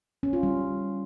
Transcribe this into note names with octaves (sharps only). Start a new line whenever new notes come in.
C#4
F4
G3